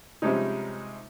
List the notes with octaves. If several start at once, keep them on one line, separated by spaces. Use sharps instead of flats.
C3 F3 G3 G#3 C#4 D#4